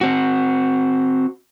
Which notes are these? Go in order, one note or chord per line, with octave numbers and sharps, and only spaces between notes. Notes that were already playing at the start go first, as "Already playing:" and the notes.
C4 F#4